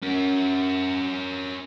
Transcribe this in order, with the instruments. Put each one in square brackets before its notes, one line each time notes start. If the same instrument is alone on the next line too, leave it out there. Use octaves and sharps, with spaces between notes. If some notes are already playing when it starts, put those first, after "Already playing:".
[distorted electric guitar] C#4 A#4